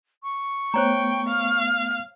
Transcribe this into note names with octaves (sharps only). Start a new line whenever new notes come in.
C#6
A3 B3 C5 C#5 G5 A#5
F5